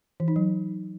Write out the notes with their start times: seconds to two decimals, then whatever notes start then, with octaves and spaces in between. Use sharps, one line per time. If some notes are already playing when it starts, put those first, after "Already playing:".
0.20 E3
0.28 D#4
0.36 F#3